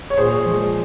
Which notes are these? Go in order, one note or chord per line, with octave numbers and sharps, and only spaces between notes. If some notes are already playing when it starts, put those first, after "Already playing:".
C#5
A#2 G#4 C5
F3 G#3